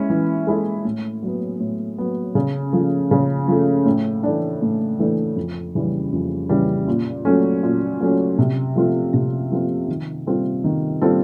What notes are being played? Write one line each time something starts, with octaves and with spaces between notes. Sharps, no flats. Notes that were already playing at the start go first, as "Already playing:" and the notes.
Already playing: G#3 C#4 E4
E3
G#3 C#4 E4 A4
A2
F#3 B3
A2
F#3 B3
C#3
F3 A3
C#3
F3 A3
A2
E3 A3 D4
A2
E3 A3 D4
F2
C#3 E3 G3
F2
C#3 E3 G3
A#2
F#3 A3 C#4
A#2
F#3 A3 C#4
C3
F3 A3 C4 F4
C3
F3 A3 C4 F4
D#3
G3 C4 F4 A4
D#3
G3 C4 F4 A4